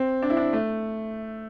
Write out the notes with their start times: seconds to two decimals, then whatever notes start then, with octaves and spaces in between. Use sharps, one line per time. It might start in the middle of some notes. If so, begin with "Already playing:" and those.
Already playing: C4
0.22 D4
0.30 E4
0.37 D4
0.53 A3